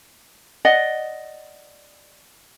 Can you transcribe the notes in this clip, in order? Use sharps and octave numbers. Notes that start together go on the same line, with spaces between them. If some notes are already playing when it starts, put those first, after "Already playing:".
D5 D#5 F#5